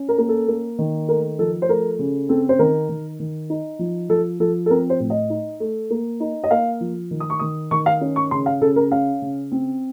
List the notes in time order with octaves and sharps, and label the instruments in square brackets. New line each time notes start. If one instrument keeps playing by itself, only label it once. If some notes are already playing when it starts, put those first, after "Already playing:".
Already playing: [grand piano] C#4
A#4
A#3
A4
A#3
D#3
A3 A#4
F3 A4
C5
A3 A#4
C#3
C4 A4
C5
D#3 A#4
D#3
D#3
D#4
F3
F3 A4
F3 A4
A4
C4 A#4
C5
A2
D#5
D#4
A3
A#3
D#4
D#5
A#3 F5
F3
D#3
D#6
C#6
D#3 D#6
D#3 C#6
F5
C#4
C#6
C#3 C6
F5
C#3 A4
A#4
C#4 F5
C#3
C4